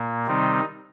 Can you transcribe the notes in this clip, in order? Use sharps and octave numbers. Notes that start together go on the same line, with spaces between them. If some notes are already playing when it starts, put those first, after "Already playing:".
Already playing: A#2 A#3
C3 D#3 G3 C4 D#4